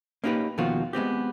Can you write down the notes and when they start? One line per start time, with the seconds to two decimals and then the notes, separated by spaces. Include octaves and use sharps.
0.24 A#3 C#4 D#4 F#4 G4 B4
0.58 D#2 B2 D#3 F3 F4 F#4
0.93 G#3 B3 C4 G4